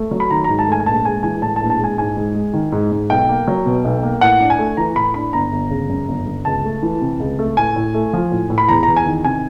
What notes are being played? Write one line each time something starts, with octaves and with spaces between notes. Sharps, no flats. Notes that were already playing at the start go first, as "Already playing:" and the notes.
Already playing: A3
F#3
B5
D#3 A#5
G#2 A#5
A5
A3 G#5
G#5
A#1 A5
G#3 G#5
E3 G#5
A2 A5
A5
A#1
A5
G#3 G#5
G#2 G#5
G#2
G#3
D#3
G#2
G#2
B1 G5
A#3
F#3
B2
B1
A#3
A2 F#5
D4
G#5
A3
E3 A#5
A2 B5
D4 B5
G1 A#5
G1
C#3
F#2
G1
G1
C#2 A5
A3
E3
C3
C#2
A3
A2 G#5
A2
A3
F3
A2
A2
B5
E2 A#5
E2 A#5
G#5
D#3
C3 G#5